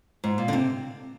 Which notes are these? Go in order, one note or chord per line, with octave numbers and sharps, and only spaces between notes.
G#2
A#2
D3
C3